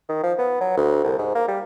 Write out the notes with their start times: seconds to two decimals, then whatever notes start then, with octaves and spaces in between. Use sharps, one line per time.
0.09 D#3
0.23 F3
0.39 B3
0.61 F#3
0.77 D2
1.04 C2
1.18 G#2
1.35 A#3
1.48 G3